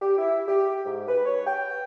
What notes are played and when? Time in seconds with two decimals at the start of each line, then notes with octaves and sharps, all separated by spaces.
0.02 G4
0.18 E4
0.47 G4
0.86 G#2
1.09 B4
1.26 C#5
1.47 G5